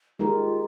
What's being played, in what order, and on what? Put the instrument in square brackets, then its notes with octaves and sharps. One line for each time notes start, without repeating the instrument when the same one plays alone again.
[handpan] G#3 D#4 G4 A#4 [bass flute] F4